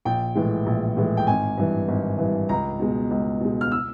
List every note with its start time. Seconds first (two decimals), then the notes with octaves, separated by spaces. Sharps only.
0.05 A#1 G5
0.35 A2 E3 G#3
0.66 A#1
0.97 A2 E3 G#3
1.17 G5
1.27 G#1 G#5
1.57 G2 E3
1.88 G#1
2.18 E3
2.23 G2
2.49 C#2 A#5
2.80 B2 G#3
3.11 C#2
3.40 B2 G#3
3.61 F6
3.72 E6